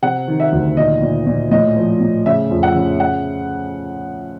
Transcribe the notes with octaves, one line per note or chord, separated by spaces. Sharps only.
C3 F#5
D#3
E5
D2
A#2 D#5
A#2
A#2
A2 D#5
F3
A2
C#3 E5
F2
F#5
C#3
F#5